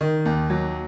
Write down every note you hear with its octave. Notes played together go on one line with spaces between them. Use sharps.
D#3
D#2
F#3